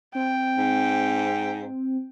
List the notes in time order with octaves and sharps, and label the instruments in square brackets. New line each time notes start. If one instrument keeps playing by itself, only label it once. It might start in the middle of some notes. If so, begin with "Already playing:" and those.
[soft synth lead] C4 [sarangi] G5
[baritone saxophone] G#2